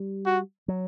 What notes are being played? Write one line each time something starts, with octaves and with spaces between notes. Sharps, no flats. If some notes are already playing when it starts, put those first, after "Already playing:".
Already playing: G3
F#4
F#3